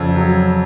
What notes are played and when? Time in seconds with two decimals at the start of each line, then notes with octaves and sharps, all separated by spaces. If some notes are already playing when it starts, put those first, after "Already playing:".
Already playing: F2 C#3
0.16 F#3